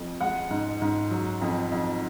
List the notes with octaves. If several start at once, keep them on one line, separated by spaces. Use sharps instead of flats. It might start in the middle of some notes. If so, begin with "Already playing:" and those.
Already playing: F2
G#3 F#5
G#2
G#2
F#3
F2
F2